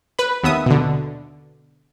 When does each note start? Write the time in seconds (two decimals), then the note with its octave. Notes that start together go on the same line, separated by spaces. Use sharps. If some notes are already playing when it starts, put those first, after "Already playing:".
0.19 B4 B5
0.43 D#2 B3 E5 D#6
0.66 B2 D3